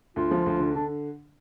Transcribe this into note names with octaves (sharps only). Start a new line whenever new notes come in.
D2 F4
F3
D2
D3
D3 D4